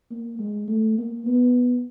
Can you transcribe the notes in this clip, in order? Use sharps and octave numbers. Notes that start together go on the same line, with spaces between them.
A#3
G#3
A3
A#3
B3